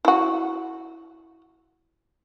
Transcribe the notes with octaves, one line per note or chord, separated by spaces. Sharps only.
E4 F#4